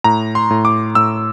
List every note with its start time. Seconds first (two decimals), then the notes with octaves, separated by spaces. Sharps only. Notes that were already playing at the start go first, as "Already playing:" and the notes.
0.04 A2 A#5
0.35 C6
0.51 A2
0.65 D6
0.95 A2 E6